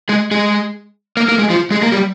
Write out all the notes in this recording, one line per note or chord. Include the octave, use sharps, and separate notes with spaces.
G#3 G#4
G#3 G#4
A#3 A#4
A#3 A#4
G#3 G#4
F3 F4
G#3 G#4
A#3 A#4
G3 G4